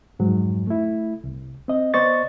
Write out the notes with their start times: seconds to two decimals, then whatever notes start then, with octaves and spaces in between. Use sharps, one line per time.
0.19 F2 G#2 F#3
0.67 A3 E4
1.24 C2
1.68 C4 D#5
1.94 B3 C5 D5 D#5 C#6 A6